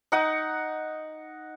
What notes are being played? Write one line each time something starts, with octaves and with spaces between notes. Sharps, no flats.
D#4 F#5 D#6